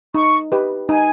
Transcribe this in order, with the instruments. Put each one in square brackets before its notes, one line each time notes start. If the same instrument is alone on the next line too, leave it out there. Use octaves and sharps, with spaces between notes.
[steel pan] D#4 [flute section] C#6
[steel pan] G4 B4 D#5
[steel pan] D#4 [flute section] G#5